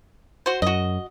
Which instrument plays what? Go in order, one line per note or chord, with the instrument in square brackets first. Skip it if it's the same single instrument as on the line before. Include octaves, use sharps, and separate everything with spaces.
[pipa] F#4 C5
[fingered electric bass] F#2 [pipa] F#4 D#5